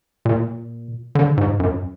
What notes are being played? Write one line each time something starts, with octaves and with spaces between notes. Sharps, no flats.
A#2
D3
G#2
F#2